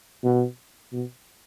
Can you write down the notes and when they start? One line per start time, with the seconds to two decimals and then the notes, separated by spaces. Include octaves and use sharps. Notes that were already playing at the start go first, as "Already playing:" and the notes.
0.23 B2
0.93 B2